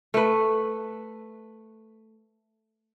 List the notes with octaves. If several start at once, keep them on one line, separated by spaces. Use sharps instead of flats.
A3 B4